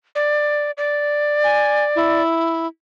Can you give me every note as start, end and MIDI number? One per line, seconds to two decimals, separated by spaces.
0.15 0.71 74
0.78 2.22 74
1.44 1.84 80
1.96 2.67 64